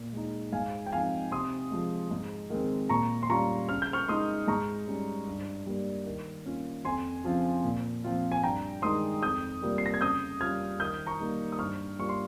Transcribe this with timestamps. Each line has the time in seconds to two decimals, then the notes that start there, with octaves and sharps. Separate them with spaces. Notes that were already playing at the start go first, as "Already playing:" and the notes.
Already playing: A#2
0.13 G#3 D#4
0.52 G#2 F5 G#5
0.86 G5
0.92 F3 C4 D#4 F5 G#5
1.31 C3 C6 D#6
1.71 F3 G#3
2.11 G#2
2.50 D#3 G#3 C4
2.89 A#2 A#5 C#6
3.23 C6
3.30 G3 C#4 F4 A#5 C#6
3.69 C#3 F6
3.82 G6
3.93 C#6 F6
4.08 G#3 D#4 C6 D#6
4.48 G#2 A#5 C#6
4.88 G3 C#4
5.27 G2
5.66 G3 A#3
6.06 D#3
6.46 A#3 C#4 F4
6.85 F2 G#5 C6
7.24 C#3 F3 C4 F4
7.64 A#2
8.04 F3 C4 F4
8.32 G#5
8.43 G2 G5 A#5
8.82 D#3 G#3 D#4 C6 D#6
9.22 F2 D#6 G6
9.62 C3 G3 A#3 F4
9.78 C7
9.86 A#6
9.94 G#6
10.01 C#3 D#6 G6
10.41 G3 C#4 F4 F6 G#6
10.80 D#3 D#6 G6
11.06 A#5 C#6
11.20 G3 A#3 D#4
11.52 D#6
11.59 G2 C#6 F6
11.99 G3 A#3 F4 C#6
12.09 C6